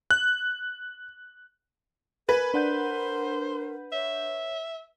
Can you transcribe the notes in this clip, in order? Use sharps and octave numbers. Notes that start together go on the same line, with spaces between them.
F#6
A#4 B4 G#5
D4 C5 F#5 G6
C#5 E5